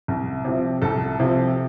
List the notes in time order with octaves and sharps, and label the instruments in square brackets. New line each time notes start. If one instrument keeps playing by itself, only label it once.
[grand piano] C2
C3 F3
C2 A4
C3 F3